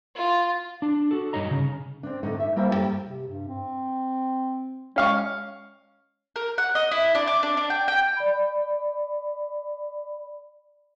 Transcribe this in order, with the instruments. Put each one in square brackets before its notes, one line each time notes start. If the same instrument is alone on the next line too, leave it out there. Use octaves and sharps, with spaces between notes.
[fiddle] F4
[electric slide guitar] D4
F#4 A4
G2 D#4 C#5 D#5 A#5
C#3 C#4
[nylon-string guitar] C4 D4
A2 D3 D#4
E5
G3 A#3 E4 C5 F5 G5
F#2 A3 F#4 G4 G5
[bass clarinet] C3
G2
C4
[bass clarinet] G#3 [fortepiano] C#4 F5 C#6
[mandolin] A#4
F#5
D#5
E4
D4
D6
D4
D4
G5
G5
[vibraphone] D5 B5